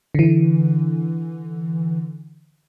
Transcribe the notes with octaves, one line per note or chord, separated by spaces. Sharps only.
D3 E3